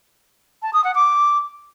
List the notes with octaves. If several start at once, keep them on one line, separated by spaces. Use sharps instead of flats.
A5
D#6
F#5
D6